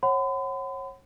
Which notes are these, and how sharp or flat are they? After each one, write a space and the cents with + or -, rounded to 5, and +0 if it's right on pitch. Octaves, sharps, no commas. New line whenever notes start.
C#5 -35 F#5 +20 B5 +45